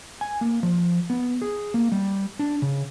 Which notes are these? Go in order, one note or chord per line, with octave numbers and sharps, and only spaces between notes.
G#5
A#3
F3
B3
G#4
A#3
G3
D4
C#3